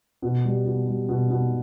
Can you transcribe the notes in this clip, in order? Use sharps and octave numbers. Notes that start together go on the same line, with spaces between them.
B2
G3
B2
G3
B2
B2